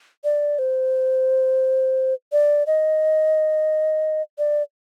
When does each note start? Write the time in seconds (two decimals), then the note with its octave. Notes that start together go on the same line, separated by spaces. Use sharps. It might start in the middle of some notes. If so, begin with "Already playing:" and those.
0.24 D5
0.59 C5
2.32 D5
2.67 D#5
4.38 D5